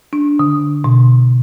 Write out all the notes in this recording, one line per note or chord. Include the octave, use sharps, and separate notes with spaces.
D4
D3
B2